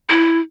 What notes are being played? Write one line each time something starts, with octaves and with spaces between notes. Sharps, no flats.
E4